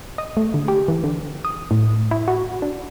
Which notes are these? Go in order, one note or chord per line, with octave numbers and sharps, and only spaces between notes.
D#5
A3
D3
G4
E3
D3
D#6
A2
E4
F#4
D4